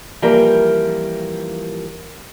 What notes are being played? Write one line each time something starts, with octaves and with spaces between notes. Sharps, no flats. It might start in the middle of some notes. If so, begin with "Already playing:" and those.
E3 F3 G3 A#3 G4 A#4